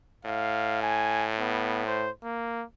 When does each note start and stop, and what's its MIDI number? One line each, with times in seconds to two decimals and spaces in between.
0.25 2.08 45
0.25 0.79 77
0.82 1.27 80
1.39 1.86 59
1.87 2.10 72
2.24 2.65 58